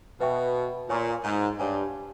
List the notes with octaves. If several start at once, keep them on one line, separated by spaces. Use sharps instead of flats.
B2 B4 E5 G5 C#6
A#2 C#5 G#5 C#6
G#2
G2 G4 C#5 G#5